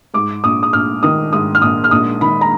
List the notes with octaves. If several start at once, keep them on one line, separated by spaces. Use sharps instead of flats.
G#2 D6
A#1 D#6
D#6
A#1 F6
D#3 D#6
G#2 D#6
F6
A#1 D#6
F6
A#1 D#6
D#3 B5
A#5